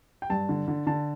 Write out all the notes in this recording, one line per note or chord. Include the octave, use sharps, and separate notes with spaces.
G5
G2 A5
D3
D3
D3 A5